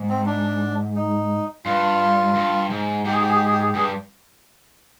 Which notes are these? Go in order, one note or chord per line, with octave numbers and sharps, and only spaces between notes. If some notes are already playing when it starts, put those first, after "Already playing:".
Already playing: G#2
C4
D4
D#4
G2 F4
G2
G#2
G#2 G4
G#4
G4
G#4
G4
G#4
G4
G#4
G4
G2 G#4
G4